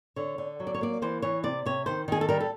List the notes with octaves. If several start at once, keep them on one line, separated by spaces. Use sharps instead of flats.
D3 C#5
D3
F#3
D5
C#5
A#3 D5
E3 C5
E3 C#5
C3 D5
C3 C#5
D#3 C5
D#3 G#4
A4
G3 A#4
A4